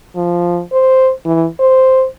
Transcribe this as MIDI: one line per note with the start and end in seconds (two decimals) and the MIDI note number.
0.16 0.61 53
0.72 1.11 72
1.25 1.47 52
1.60 2.06 72